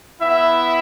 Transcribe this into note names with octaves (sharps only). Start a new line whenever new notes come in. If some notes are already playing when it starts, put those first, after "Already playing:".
B3 E4 E5